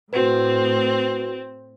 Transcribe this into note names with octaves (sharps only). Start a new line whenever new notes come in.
A2 C4 F#4 B4